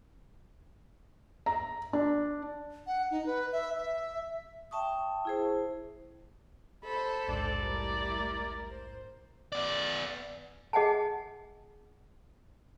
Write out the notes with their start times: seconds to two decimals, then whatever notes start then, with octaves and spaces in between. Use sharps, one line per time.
1.46 A#5
1.93 D4
2.87 F#5
3.11 D#4
3.26 B4
3.52 E5
3.78 E5
4.71 E5 G5 A5 C#6 D#6
5.25 E4 G#4 C5
6.84 A4 C5 B5
7.28 A#1 D#2 G#2 D4 D5
7.63 G3 A3 E4 A#4
8.69 C5
9.53 B3 D5
10.73 G#4 D#5 F#5 G#5 A5